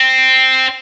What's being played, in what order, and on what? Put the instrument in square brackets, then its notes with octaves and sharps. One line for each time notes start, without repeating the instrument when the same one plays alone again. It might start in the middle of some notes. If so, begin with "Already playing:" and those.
Already playing: [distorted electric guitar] C4